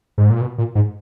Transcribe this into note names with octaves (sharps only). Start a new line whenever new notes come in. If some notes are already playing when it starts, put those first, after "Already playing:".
G#2
A#2
B2
A#2
G#2